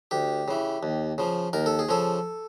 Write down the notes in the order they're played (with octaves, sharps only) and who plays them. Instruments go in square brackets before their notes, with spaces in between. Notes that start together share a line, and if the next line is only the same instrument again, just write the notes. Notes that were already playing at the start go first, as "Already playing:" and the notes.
[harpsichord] D2 G4
C#3 E3
D#2
C#3 F3
D#2 A#4
A4
G#4
C#3 F3 A4